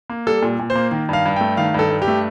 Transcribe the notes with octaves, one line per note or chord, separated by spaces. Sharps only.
A#3
G3 A4
A#2
A#2
C5
A#3
D#3
G2 F5
G2
A3 G5
D#3 F5
G2 A4
G2
G4
A3